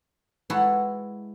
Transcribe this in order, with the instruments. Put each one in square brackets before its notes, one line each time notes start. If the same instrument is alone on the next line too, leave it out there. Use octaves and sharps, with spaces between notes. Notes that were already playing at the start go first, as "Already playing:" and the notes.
[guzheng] G#3 E4 F#4 A4 B4